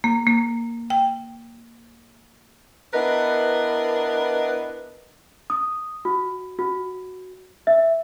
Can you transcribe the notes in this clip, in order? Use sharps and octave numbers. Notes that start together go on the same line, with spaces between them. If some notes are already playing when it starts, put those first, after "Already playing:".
A#3
A#3
G5
B3 D4 E4 A#4 B4 D#5
D#6
F#4
F#4
E5